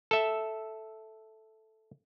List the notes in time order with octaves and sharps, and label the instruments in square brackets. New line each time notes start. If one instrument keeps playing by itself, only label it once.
[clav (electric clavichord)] A4 E5